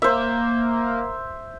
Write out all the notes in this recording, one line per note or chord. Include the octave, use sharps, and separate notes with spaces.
A#3 C5 E5